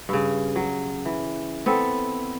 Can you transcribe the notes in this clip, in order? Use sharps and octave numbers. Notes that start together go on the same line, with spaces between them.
G2 C#3
F#3
E3
B3 C4 A4